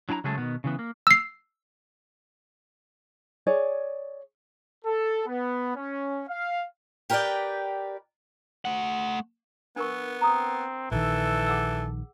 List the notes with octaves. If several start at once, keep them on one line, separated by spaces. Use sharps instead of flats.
F#3 D4 E4 G5 A#5
C#3 F#3 G#3 A3 G#4 A4
B2 D#3 B3
C#3 E3 B3
A#3
E6 C7
G#4 C#5 D5
A4
B3
C#4
F5
G4 A#4 B4 C#5 D5 G5
A3 F#5
B3 D4 A#4 C#6
C4 A#5 D#6
A#1 D#3 E3 A4
G#4 F#5 E6